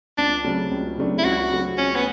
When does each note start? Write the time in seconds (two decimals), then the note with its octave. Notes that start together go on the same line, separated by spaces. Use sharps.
0.18 C#2 D4
0.44 C#3 F#3 A3 D4
0.71 C#2
0.98 C#3 F#3 A3 D4
1.18 E4
1.25 C#2 F#4
1.51 C#3 F#3 A3 D4
1.78 C#2 C#4
1.96 B3